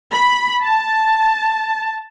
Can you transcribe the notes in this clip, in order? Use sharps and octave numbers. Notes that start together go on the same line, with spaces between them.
B5
A5